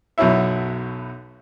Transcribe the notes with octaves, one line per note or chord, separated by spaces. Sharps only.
B1 F#2 B2 F#3 E4 E5